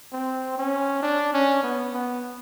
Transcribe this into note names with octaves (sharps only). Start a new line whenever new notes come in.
C4
C#4
D4
C#4
B3
B3